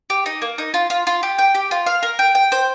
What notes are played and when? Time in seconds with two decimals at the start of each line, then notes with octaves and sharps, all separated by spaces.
0.10 G4
0.26 D#4
0.42 A#3
0.58 D#4
0.74 F4
0.90 F4
1.07 F4
1.23 G4
1.38 G5
1.55 G4
1.71 F4
1.86 F5
2.03 A#4
2.19 G5
2.35 G5
2.52 C5